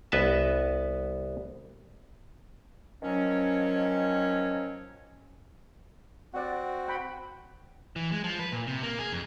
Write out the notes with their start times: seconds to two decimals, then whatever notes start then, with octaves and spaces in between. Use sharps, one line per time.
0.12 C2 B3 B4 D#5 E5 A5
3.02 D#3 F3 F#3 C#4
6.34 C4 F#4 D5 F#5
6.87 F#5 G5 B5
7.96 E3
8.12 G#3
8.24 F3
8.39 B4
8.52 A#2
8.67 C3
8.82 A#3
8.99 G#4
9.12 F2